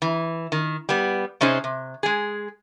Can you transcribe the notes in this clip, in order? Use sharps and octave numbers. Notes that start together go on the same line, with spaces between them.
E3
D#3
G3 B3
C3 C#4 D#4 G#4 C5
C3
G#3 G#4